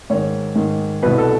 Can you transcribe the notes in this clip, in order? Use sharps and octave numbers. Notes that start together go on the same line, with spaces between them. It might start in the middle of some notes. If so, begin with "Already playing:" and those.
G#2 D#3 C#5
G#2 D#3
C2 B2 B4
A4